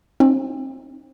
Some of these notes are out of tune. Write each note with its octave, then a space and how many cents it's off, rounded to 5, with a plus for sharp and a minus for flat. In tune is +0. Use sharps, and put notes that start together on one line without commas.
C4 +30 D#4 -20